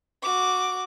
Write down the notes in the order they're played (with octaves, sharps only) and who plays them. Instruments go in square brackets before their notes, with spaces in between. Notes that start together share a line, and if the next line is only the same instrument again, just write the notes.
[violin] F#4 D6